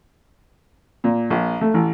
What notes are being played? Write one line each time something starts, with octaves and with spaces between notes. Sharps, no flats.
A#2
A#1
A3
A1